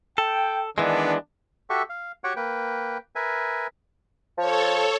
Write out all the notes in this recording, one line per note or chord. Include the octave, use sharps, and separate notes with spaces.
A4 G5
D#3 E3 G#3 B3 D4
F#4 G4 A4 E5 C#6
F5
F#4 G4 C#5 F#5 G5 C#6
A#3 B4 G5
A#4 B4 E5 G#5
F3 A4 C#5